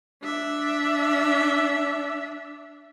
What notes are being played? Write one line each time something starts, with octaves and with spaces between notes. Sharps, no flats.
D4 E5